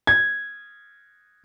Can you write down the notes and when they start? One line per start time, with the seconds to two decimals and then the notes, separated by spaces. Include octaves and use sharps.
0.07 G#6